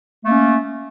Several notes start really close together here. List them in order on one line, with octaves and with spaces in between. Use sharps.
A3 A#3 C#4